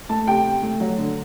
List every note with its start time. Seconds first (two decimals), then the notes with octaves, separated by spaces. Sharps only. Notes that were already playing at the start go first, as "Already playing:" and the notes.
0.09 A3 A5
0.27 C3 G5
0.45 C3
0.63 A3
0.80 F#3
0.97 D3